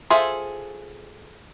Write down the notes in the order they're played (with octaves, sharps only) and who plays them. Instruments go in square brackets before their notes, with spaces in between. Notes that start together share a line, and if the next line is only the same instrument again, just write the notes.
[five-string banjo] F4 G#4 A4 C5 E5